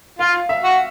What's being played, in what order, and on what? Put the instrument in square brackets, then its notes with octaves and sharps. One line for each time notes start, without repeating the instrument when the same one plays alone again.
[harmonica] F4 [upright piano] F5
[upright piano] E5
[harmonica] F#4